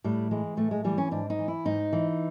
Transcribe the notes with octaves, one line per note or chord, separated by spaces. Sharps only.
A2 G3
E3 G#3
A2 A3
G#3
E3 G3
C#4
G#2 D4
D#4
E3
E4
G#2 D#4
E3